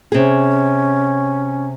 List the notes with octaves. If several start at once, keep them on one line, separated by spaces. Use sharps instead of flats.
C3 C#4 G#4